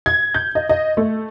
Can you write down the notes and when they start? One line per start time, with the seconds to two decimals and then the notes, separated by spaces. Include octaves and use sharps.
0.06 G#6
0.34 G6
0.55 D#5
0.69 D#5
0.97 A3